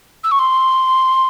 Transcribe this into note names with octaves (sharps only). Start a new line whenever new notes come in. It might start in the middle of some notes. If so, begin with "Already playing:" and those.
E6
C#6
C6